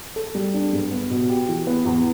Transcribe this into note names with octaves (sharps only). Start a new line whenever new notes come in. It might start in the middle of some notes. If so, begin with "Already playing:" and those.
A4
G3
D4
G2
B3
B2
G4
E3
B3
E2